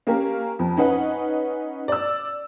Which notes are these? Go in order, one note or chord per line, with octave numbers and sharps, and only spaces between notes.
A#3 C#4 G4 A#4
F2
C#4 D#4 B4 F#5
D5 E6